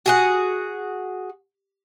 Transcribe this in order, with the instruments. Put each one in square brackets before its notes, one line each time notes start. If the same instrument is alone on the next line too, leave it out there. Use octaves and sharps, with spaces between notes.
[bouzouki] F#4 G#4 F#5